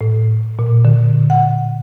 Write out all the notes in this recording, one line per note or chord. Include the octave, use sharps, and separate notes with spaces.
A2
A#2
D3
F#5